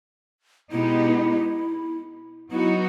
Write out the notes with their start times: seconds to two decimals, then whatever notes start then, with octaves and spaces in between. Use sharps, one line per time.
0.72 B2 G#3 B3 D#4 E4 G4
2.51 F#3 B3 D#4 E4 F#4